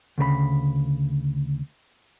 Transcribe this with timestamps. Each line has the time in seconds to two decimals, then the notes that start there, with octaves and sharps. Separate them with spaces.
0.18 D2 C#3 A#4 B5